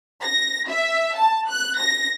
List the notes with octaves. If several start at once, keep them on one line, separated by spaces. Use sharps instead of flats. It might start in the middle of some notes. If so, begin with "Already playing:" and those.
A#6
E5
A5
F#6
A#6